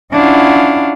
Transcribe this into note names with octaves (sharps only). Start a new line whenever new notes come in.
C#4 D4 E4 F4 F5 F#5